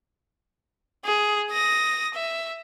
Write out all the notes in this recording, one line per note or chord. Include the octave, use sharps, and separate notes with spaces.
G#4
D#6 A#6
E5